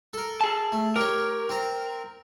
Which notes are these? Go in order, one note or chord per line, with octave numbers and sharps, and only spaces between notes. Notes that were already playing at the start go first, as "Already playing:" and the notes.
A4 A#4
G#4 A5
A3
G4 A#4 C#5
C4 A#5